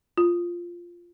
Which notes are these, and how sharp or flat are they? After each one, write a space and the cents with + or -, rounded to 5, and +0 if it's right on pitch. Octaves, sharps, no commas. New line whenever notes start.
F4 -5